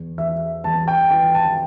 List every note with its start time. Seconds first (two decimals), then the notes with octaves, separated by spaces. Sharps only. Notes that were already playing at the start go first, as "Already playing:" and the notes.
Already playing: E2
0.18 E2 E5
0.64 E2 A5
0.88 G5
1.11 E3 G5
1.34 A5